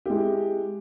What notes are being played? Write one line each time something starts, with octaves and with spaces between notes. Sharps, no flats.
G#3 E4 G4